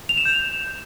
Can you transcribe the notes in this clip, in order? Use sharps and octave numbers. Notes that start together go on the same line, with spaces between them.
F7
E7
G6